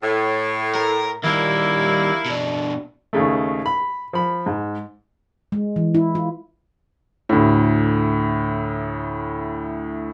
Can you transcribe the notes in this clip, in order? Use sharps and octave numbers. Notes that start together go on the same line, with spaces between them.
A2
A#4
D#2 G3 A#3 E4
B2 D4
D#2 C#3 A3
B5
F3 B5
G#2
G#3
E3
E4
F4
D2 A2